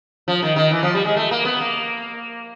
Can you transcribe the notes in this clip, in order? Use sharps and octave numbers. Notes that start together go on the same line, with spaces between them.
F3
D#3
D#3
E3
F3
G3
G#3
A3
A#3
B3
A#3